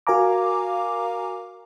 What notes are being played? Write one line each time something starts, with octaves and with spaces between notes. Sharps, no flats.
F#4 A#4 F5 G#5 A#5 D6